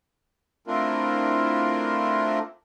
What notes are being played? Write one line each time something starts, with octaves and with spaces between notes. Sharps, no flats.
A3 C4 D4 E4 F4 A#4